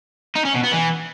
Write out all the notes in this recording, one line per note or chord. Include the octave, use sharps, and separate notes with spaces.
D#4
C#4
B2
B3
E3